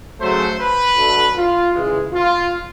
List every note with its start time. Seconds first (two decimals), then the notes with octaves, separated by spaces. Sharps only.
0.20 C#3 F#3 A3 C5
0.59 B4
0.96 D3 F#3 A3
1.36 F4
1.74 C#3 E3 G#3
2.13 F4